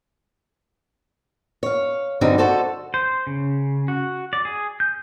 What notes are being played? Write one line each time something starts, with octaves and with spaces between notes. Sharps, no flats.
C#5 F5
G2 D3 F#3 G3 C4 D#4
F#4 A4 C5 D5
C5
C#3
F#4
D5
G#4
G6